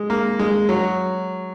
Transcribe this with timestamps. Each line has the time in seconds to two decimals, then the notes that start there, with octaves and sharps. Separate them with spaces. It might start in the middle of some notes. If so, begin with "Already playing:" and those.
Already playing: G#3
0.10 A#3
0.39 G#3
0.69 F#3